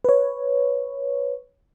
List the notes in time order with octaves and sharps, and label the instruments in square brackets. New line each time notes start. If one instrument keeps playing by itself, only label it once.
[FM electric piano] B4 C#5